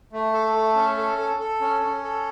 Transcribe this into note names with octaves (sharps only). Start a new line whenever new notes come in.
A3
A4
A3
C#4
A4
A4
A4
C#4
C#4
A4